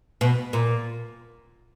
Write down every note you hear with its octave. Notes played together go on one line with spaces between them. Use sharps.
B2
A#2